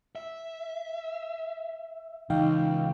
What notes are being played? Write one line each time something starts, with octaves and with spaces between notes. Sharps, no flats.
E5
C#2 E3 D#4 F5 G5